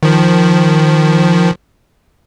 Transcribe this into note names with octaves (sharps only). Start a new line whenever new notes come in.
D#3 F3